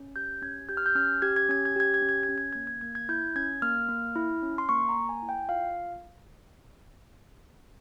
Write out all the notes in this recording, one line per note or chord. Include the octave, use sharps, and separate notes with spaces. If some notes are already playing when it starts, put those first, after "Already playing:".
Already playing: C#4
G4 G6
C#4 G#6
G4 G6
F6
G6
C#4 F6
G4 G#6
G#6
C#4 G#6
G#6
G4 G#6
G#6
C#4
G#6
G#6
C#4
G#6
G#6
A#3
G#6
A#3 G#6
G#6
E4 G6
C#4 G#6
A#3 F6
A#3
E4
C#4
C6
A#3 C#6
A#5
A#3
G#5
E4
G5
F4 F5